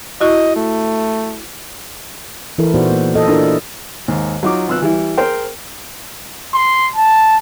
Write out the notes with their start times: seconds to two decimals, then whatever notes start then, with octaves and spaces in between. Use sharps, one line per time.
0.21 E4 F#4 D#5 C#6
0.56 A3
2.58 E3 E4 A4 A#4
2.74 A#2 B3 D#4 F#4 C5 D5
2.91 A#3
3.15 A4 D#5
3.28 D4 E4 F4 A4 A#4
4.08 D#2 G#2
4.43 F#3 D#4 F4 D6
4.68 G#1 F4 B4 E6 F#6
4.82 E3 G3 E4
5.18 G#4 A#4 C5 G5
6.54 C6
6.96 A5